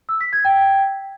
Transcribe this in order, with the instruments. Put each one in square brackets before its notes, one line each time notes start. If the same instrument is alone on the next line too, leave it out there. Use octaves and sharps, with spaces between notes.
[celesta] E6
B6
G#6
G5